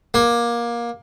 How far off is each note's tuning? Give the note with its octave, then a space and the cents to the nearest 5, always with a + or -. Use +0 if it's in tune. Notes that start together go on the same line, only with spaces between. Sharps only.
A#3 +20